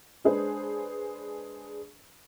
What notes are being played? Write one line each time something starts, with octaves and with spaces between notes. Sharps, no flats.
G#3 D4 G#4 B4 C5